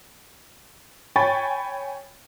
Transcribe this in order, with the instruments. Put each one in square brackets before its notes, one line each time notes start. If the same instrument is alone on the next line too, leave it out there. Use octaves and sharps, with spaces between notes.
[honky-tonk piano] C#5 G5 G#5 B5 C#6 A6